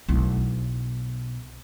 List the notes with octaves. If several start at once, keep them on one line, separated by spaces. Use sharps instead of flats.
B1 E4